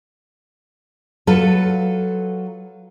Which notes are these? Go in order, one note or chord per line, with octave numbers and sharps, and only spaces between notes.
F#3 F4 A4 B4